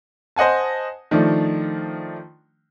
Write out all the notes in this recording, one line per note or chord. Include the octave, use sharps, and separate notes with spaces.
C5 D#5 F#5 G#5 A5
D#3 F3 A3 D4